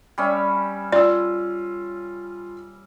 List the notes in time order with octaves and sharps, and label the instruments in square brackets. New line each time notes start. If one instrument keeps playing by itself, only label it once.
[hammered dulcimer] G3 C#4 E5
[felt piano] F4 E6 [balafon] D5